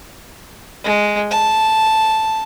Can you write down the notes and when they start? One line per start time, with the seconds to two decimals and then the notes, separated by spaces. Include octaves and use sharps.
0.84 G#3
1.31 A5